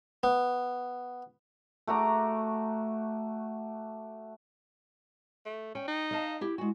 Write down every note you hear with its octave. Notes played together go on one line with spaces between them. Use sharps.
B3
A3 F#4 A#5 D6
A3
C#4 G5
D#4
D#5 F5 A5
E4 G4
G#3 F#4